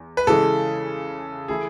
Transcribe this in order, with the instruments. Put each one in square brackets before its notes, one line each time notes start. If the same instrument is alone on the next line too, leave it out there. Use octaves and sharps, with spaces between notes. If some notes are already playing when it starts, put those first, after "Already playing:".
Already playing: [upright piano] E2
[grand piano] B4
[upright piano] C#3 E3 G#3 [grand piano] A4
[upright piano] E3 A3 E4 [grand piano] G#4